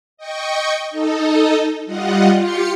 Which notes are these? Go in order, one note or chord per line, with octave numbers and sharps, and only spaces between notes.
D#5 G5 C#6
D#4 A4 D#5
G3 F4 D#5 F#5
F4 G4 C6 C#7